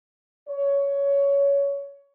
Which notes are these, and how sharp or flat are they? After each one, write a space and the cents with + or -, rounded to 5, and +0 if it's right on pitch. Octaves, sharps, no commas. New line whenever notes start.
C#5 +15